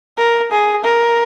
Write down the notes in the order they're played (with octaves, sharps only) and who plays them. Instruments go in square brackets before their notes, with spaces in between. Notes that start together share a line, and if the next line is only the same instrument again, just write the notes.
[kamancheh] A#4
G#4
A#4